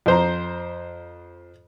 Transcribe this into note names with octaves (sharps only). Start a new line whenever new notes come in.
F2 C5 A#5